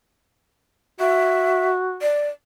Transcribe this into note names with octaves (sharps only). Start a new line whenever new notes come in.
F#4 E5
D5